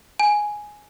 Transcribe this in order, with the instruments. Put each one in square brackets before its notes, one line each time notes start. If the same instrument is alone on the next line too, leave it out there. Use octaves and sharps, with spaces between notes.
[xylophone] G#5